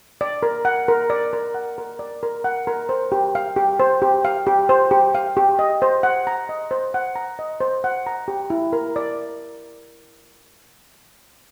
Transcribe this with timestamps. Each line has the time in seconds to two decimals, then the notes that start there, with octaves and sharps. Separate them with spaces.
0.21 D5
0.43 A#4
0.65 F#5
0.88 A#4
1.10 D5
1.33 A#4
1.55 F#5
1.78 A#4
1.99 D5
2.23 A#4
2.44 F#5
2.67 A#4
2.89 C5
3.12 G4
3.35 F5
3.56 G4
3.80 C5
4.02 G4
4.25 F5
4.47 G4
4.69 C5
4.91 G4
5.15 F5
5.37 G4
5.59 D#5
5.82 C5
6.03 F#5
6.27 A#5
6.49 D#5
6.71 C5
6.94 F#5
7.16 A#5
7.39 D#5
7.61 C5
7.84 F#5
8.07 A#5
8.28 G4
8.50 E4
8.73 A#4
8.96 D5